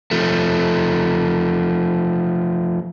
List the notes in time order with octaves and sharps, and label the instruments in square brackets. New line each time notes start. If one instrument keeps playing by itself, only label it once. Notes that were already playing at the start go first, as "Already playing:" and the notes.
[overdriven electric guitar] F3 A3